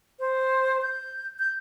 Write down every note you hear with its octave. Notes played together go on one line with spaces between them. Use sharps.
C5
G6
G6